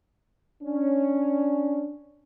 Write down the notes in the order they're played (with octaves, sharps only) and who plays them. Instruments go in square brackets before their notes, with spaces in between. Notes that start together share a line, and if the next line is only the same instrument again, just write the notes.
[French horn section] C#4 [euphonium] D4